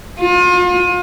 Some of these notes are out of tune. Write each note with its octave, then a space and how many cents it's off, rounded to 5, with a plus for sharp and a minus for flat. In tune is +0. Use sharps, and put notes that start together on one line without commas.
F4 +40